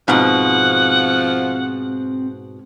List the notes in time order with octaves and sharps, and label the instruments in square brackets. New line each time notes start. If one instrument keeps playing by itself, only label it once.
[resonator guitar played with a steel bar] G#2 B2 [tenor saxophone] F3 [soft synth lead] C4 [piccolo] F#5